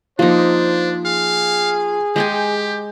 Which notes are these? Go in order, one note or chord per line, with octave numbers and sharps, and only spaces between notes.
F3 A#3 D4 D#4 C5
G#4 F5
G#3 G4 G5 G#5